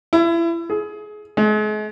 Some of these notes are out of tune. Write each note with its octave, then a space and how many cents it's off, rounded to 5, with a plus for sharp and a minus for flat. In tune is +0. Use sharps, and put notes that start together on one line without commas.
E4 +30
G#4 +25
G#3 +40